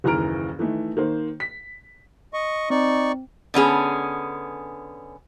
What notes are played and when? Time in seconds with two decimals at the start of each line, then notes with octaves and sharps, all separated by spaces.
0.04 F#1 D#2 E3 A#5 F6 D7
0.59 D#3 E3 A3
0.97 D#3 A#3 C5
1.40 B6
2.34 D#5 C#6
2.70 C4 D#4 D5 C#6
3.54 D3 B3 C#4 G#4